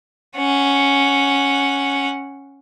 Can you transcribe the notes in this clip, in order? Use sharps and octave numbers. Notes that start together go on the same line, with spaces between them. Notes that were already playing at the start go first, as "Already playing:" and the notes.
C#4 F#5